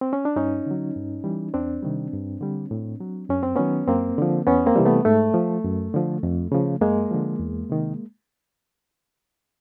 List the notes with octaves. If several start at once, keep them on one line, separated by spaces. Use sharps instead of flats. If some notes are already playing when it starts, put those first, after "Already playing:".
C4
C#4
D4
G2 C#4 D#4
D3 F#3
G2
E3 G3
E2 C4 D4
C3 D#3 G3
G2
D3 G3
A2
F#3
F#2 C#4
C4
D#3 F#3 B3 C#4
F#2 A#3 C4
D3 F3
E2 B3 C#4
A#3 C4
C3 E3 G3
A3 B3
G#2 A3
F3
F#2
D3 F3
F2
C#3 F3
F#2 G#3 A#3
D3 F3
E2
C3 D#3